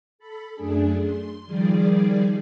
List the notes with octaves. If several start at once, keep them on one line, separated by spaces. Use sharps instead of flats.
A4 B5
F#2 A3 D4 G#4
C6
D#3 F3 G3 G#4 D5